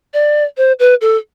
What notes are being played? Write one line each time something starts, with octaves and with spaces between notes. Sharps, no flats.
D5
C5
B4
A4